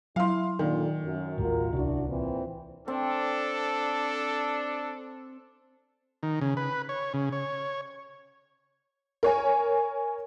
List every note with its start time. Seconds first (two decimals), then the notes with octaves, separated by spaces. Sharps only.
0.16 F#3 E4 F5 C6
0.59 A#2 D3 D#3
1.02 F#2
1.38 A1 D#2 A3 F4 F#4 A#4
1.73 D1 C2 D4 E4 F#4
2.08 A#2 E3 C4
2.88 C4 D4 A4
6.23 D#3
6.41 C#3
6.57 B4
6.89 C#5
7.14 C#3
7.33 C#5
9.23 A#4 C#5 G#5